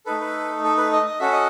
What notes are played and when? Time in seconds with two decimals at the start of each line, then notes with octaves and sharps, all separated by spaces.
0.06 A3 D#4 A4 B4
0.20 B4
0.64 A4
0.77 B4
0.92 D#5
1.06 D#5
1.19 C#4 F#4 A4 E5
1.32 D#5